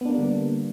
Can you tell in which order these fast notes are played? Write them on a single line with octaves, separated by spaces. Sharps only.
B3 D4 A#3 G3 D3